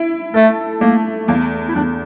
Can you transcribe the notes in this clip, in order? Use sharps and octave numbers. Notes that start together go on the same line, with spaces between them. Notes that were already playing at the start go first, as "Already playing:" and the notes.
Already playing: E4
A3 A4
A3 A#3
E2 A#3
E4
E2 D4